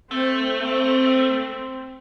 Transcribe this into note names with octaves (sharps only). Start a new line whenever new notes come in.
A3 C4
C4